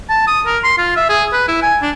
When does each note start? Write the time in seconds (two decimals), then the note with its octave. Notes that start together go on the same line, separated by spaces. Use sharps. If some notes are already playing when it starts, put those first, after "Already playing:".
0.09 A5
0.27 D#6
0.46 A#4
0.64 C6
0.78 F4
0.96 E5
1.09 G#4
1.32 B4
1.48 E4
1.62 G#5
1.82 D4